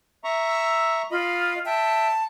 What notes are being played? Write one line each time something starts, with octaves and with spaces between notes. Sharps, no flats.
E5 A#5 C#6
E6
F4 D#5 B5
E5 G5 A5